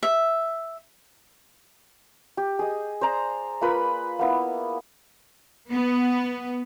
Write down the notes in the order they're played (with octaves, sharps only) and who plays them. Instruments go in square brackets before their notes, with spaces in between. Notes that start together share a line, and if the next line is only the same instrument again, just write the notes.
[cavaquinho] E5
[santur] G4
G#4 D#5
C5 D5 A#5 C6
A#3 F4 B4 B5
A#3 B3 E4
[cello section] B3